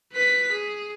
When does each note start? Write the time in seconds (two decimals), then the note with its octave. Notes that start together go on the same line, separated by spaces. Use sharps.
0.13 B4 B6
0.52 G#4